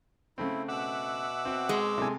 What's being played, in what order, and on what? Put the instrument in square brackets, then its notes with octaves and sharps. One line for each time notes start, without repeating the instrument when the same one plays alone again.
[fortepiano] C#3 A3 C4 [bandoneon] E4
[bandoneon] B2 D6 E6 [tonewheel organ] E5 F#5
[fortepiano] C4 F#4
[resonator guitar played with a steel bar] G#3
[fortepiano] C3 A4 G#5 [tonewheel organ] B3 D4 E4